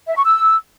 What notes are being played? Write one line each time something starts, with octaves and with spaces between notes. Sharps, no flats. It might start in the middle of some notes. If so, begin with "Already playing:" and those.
E5
C#6
E6